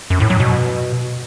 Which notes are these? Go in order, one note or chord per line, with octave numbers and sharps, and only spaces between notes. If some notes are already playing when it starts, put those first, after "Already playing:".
F#2
A2
F#3
B2